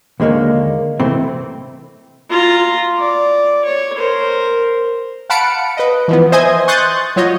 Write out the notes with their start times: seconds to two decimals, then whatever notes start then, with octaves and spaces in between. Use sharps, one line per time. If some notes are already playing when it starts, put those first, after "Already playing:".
0.20 D#2 D3 G#3 A#3 C#5
1.00 C3 E3 A3 C4
2.30 F4 A#5
2.99 D5
3.65 C#5
3.96 A#4 C5
5.30 F5 F#5 A5 B5 C#7 D7
5.77 B4 D#5
6.08 E3 F3 B3
6.32 C5 D#5 E5 G#5 G#6
6.68 C6 C#6 D#6 F#6 G6 A6
7.16 F#3 F4 C#5 D#5